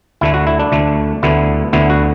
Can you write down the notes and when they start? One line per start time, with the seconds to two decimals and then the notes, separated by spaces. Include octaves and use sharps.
0.21 D2 D3 A3 E4
0.34 F#4
0.47 E4
0.60 D4
0.72 D2 D3 A3
1.23 D2 D3 B3 E4
1.73 D2 D3 B3 E4
1.90 F#4